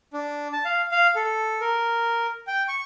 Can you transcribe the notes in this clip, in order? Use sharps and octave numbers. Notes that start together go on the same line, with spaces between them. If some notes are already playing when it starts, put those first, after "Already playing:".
D4
A5
F5
F5
A4
A#4
G5
C#6